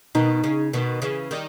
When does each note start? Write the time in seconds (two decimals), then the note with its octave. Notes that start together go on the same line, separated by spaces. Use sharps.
0.15 B2 D#3 D#4
0.44 C#3
0.73 B2 D#3
1.02 C#3 E3
1.31 D#3 G3